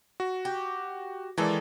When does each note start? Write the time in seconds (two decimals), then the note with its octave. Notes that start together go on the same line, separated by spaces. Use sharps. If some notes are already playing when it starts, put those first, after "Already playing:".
0.20 F#4
0.45 G4
1.38 D#3 E3 G#3 A#3 A4 D5